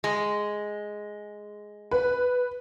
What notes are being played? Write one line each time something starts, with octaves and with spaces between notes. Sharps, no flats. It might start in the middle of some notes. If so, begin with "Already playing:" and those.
G#3
B4